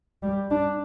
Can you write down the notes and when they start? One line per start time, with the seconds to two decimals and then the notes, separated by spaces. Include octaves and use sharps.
0.23 G3
0.50 D4